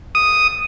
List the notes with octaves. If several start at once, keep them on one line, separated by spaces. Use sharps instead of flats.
D#6